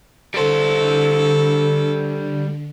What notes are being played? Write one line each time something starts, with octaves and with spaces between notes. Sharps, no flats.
D3 G3 A4 C5